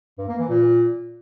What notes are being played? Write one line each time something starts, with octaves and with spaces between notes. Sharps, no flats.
G2
A#3
E3
A#2